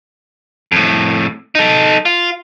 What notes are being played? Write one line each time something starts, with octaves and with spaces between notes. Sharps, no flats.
F2 A2
D#4 A4
F4